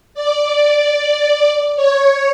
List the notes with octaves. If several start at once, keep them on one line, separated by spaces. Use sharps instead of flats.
D5
C#5